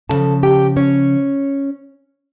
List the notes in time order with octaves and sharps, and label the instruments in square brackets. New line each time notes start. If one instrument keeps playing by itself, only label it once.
[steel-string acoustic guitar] E2 C#3 F3 A4 A5
G4 G5
C#4 C#5